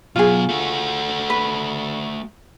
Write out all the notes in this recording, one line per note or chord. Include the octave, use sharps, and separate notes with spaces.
B2 F#3 F4 G#4
A3 F#4
B4